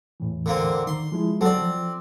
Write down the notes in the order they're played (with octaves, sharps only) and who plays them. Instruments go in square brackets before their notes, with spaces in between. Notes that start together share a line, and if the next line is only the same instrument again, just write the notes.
[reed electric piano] E2 A2 E3
[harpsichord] D3 A#3 C4
[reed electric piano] D#3 [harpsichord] C6
[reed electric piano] F3 G#3 E4
[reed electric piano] F#3 A4 F#5 [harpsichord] C4 D5
[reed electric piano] F3